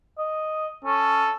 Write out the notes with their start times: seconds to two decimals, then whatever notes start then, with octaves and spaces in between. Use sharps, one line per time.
0.18 D#5
0.84 C#4 A4